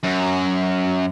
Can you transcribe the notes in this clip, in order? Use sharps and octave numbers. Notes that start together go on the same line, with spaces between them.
F#2